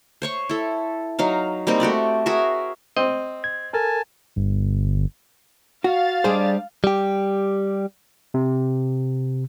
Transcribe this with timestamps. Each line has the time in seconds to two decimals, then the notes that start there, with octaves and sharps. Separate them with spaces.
0.22 C5 C#5 C#6
0.49 E4 A4
1.19 F#3 D#4 F5
1.67 G3 A#3 C4 D#4
1.80 A3 F#4 G4 D5
2.26 F#4 G#4 A#4 E5
2.97 C4 D#5
3.44 G#6
3.73 A4 A#4 G#5 A5
4.36 G1
5.84 F#4 F5 A6
6.24 G3 D4 G#4 C5
6.84 G3 G4
8.34 C3